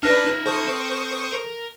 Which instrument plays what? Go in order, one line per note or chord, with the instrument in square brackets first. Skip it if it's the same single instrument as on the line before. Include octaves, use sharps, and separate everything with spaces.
[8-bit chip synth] D4 B4 [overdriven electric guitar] D#4 E5 [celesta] F6 A#6
[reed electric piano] A4 [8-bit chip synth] C5 C#6 D#6
[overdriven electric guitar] C4
A#4